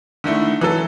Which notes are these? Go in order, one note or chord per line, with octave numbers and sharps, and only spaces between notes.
D3 D#3 A3 E4
E3 F#3 A4